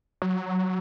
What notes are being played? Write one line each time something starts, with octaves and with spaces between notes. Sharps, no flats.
F#3